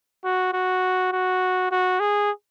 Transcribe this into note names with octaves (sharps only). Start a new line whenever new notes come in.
F#4
F#4
F#4
F#4
G#4